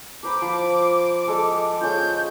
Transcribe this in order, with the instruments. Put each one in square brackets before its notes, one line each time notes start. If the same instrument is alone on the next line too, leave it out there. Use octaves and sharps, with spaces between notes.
[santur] A#4 C5 B5 [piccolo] D6
[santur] F3 C5 B5
G#3 A4
[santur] G#3 C#4 F4 [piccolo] G6